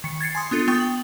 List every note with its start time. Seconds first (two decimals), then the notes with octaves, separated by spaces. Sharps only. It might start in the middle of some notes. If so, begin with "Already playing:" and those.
0.04 D#3 C#7
0.21 G#6 A6 C7 C#7
0.35 G#5 C6 D#6
0.51 B3 D4 F4 A4
0.68 B3 G5 C#6 D#6 G7
0.80 F#7